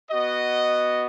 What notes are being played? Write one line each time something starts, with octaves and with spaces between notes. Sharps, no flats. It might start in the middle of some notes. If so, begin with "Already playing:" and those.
B3 F#4 D#5